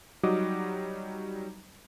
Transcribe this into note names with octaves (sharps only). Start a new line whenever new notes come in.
F#3 G3 D#4 F#4 D#5 D6